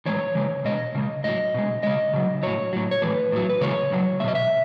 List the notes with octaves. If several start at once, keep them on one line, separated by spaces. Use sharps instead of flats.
A2 E3 G#3 C#5
C#3 E3 G#3
B2 G#3 D#5
C#3 G#3
A2 F#3 D#5
B2 G#3
C#3 G#3 D#5
C#3 F#3
A2 F#3 C#5
A2 F#3
C#5
A2 E3 G#3 B4
A2 F#3
B4
C#3 E3 G#3 C#5
C#3 F#3
G#3 E5
B2 D#5
E5